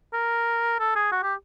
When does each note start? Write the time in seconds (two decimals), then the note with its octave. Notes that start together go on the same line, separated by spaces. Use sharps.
0.13 A#4
0.79 A4
0.95 G#4
1.12 F#4
1.23 G4